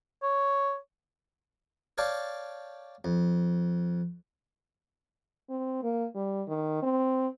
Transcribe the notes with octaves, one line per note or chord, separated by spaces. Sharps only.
C#5
C#5 D5 F5 G5 A5
F2
C4
A#3
G3
D#3
C4